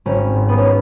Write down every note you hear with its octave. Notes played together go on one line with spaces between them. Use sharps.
G#1 C#4
G#2
B3
C#4